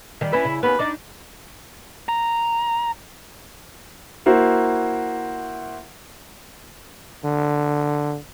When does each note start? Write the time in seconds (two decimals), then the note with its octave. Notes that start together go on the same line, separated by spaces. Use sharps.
0.21 D#3 G3
0.33 C#4 D4 E4 B4
0.45 C#3
0.63 D#2 B3 C#4 B4
0.79 D4 D#4 D5
2.09 A#5
4.26 A#3 E4 F#4 C5
7.24 D3